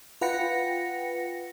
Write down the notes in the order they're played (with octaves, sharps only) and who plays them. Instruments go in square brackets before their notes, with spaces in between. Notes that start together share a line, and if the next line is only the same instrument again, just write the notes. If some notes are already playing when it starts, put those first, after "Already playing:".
[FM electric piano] F4 B4 F#5 G5 A#6 C#7